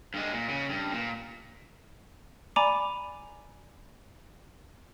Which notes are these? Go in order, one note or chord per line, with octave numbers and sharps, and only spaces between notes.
G2 G#3
A#2
C#3
G2
A#2
D5 G#5 A#5 B5 D6